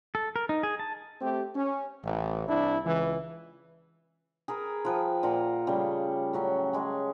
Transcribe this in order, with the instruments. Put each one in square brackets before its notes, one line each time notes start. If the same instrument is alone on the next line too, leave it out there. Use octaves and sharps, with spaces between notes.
[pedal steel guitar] A4
A#4
D#4
G#4
A5
[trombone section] A3 C4 G4
C#4
A1
C2 D4 E4
C#2 E3
[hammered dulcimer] G#4 A#4 B4
F3 B4 G5
A#2 F4 F#5 A#5
C#3 G3 A3
A2 F#3 C#4
G#3 G#5